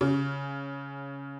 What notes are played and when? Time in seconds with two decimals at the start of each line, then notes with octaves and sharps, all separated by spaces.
0.01 C#3